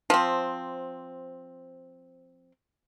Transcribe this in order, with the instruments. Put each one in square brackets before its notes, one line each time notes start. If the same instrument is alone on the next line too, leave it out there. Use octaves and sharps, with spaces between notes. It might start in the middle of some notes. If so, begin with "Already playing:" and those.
[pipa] F3 C4